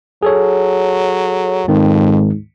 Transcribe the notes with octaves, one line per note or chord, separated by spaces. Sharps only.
F#3 G#4 A4 C#5
F2 G#2 D#3 C4